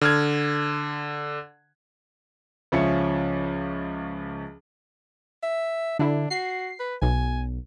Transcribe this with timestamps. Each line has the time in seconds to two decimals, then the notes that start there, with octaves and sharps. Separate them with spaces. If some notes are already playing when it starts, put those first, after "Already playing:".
0.01 D3 F6 G#6
2.72 C#2 F3 C#4 E5 C#7
5.43 E5
5.99 D3 D4 E4
6.30 F#4 C7
6.79 B4
7.02 B1 G#5